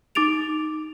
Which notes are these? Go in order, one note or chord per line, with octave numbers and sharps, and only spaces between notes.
D#4 D6 A6 D7 F7